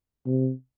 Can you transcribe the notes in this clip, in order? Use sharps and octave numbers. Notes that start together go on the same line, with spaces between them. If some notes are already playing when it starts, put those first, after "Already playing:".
C3